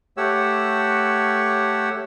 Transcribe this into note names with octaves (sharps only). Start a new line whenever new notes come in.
A3 G4 C#5 F#5 E6